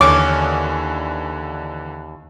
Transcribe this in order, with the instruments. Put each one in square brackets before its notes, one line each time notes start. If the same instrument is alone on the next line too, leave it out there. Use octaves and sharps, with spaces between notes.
[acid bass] D#2 [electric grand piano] D3 E3 [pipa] C#4 [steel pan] D6